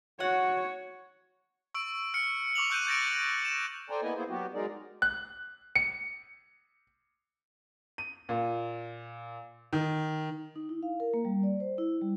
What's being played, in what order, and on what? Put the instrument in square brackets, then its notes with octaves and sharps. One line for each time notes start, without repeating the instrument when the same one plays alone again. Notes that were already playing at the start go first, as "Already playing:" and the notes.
[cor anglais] F#4 [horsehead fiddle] C#5 [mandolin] F#5
[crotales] C#6 E6 D7
F6 C#7
C#6 D6 F7 F#7
C#6 E6 F#6 G6 D7 D#7
G6 A6 A#6 D7
E7
[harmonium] A4 C5 D5 G5 G#5 A#5
A#3 B3 E4 B4 D#5 G#5
A#3 B3 E4 G#4 C5
F#3 B3 F#4 G4
F#3 G#3 D#4 G#4 A#4 D5
[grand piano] F#6
C#7
[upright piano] D#7
A#2
D#3
[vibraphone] D#4
E4
F5
A#4
A#3
G3
D5
C5
E4
G3